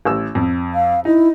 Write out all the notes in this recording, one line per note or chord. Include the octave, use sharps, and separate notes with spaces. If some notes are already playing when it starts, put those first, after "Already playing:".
A1 E6
F2
F5
D#4 E4